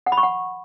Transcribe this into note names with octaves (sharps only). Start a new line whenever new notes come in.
F#5
B5
C#6
F#5